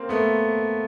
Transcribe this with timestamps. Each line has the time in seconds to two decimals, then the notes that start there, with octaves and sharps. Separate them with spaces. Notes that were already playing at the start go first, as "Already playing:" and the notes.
Already playing: A#3 C4
0.09 A3 B3